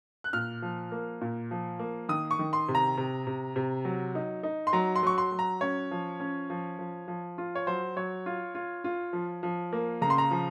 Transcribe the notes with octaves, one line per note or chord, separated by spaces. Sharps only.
F#6
A#2 F6
F3
A#3
A#2
F3
A#3
D#3 D#6
C#6
D#3
C6
C3
A#5
C3
C3
C3
F#3
D#4
D#4
C6
F#3 A#5
C6
F#3 C#6
C6
F#3
A#5
C#4 C#5
F3
C#4
F3
F3
F3
F4
C#5
F#3 C5
F#3 C#5
F4
F4
F4
F3
F3
A#3
C#3 A#5
C6
A#5
F3